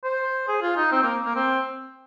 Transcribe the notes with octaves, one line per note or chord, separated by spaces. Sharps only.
C5
G#4
F4
D#4
C4
A#3
A#3
C4